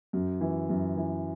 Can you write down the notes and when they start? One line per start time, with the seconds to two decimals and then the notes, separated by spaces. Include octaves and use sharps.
0.13 F#2
0.41 E3
0.69 F#2
0.97 E3